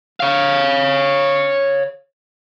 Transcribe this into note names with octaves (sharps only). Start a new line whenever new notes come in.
C#5 F5